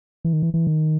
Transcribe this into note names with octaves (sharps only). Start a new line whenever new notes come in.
E3
D#3
E3
E3
D#3